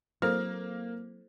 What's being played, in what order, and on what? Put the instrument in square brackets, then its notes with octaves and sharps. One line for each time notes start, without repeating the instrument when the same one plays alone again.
[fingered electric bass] F#3 C4 [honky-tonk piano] A#3 [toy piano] E4 A4 C5 [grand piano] F6